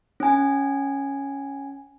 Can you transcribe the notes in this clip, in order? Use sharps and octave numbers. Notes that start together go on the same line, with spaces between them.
C#4 G#5